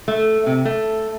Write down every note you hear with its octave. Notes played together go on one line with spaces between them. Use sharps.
A3
C3
A3